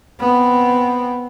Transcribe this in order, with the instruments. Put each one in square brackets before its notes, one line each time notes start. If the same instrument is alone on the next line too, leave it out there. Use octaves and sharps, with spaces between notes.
[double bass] B3 C4